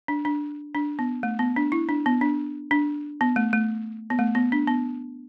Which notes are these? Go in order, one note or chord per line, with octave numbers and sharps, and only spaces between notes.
D4
D4
D4
B3
A3
B3
D4
E4
D4
B3
D4
D4
B3
A3
A3
B3
A3
B3
D4
B3